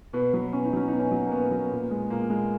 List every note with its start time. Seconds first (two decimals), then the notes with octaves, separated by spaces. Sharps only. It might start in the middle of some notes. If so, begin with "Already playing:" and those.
0.13 B2 B4
0.33 F#3 B4
0.53 B2 C#4
0.65 D#4
0.73 F#3 C#4
0.88 B2 D#4
0.99 C#4
1.11 F#3
1.26 A#3
1.31 B2 B3
1.51 F#3
1.71 A#2
1.91 G#3
2.10 A#2 A#3
2.30 G#3